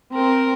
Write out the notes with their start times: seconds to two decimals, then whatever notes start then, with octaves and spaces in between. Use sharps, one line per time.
0.15 C4 A#4